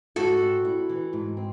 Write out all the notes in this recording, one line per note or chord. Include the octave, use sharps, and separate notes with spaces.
G#2 F#4 A4
C4
E4
E3
G#2
C4